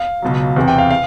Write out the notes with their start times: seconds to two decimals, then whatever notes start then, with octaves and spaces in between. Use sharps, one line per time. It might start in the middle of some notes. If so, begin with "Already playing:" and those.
Already playing: F5
0.22 C#2 B2 F#3
0.56 E2 C3 E3
0.68 G5
0.78 F5
0.90 F5